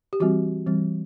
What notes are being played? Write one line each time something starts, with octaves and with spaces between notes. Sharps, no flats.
G4
E3 G3 C4 F#4
E3 G3 C4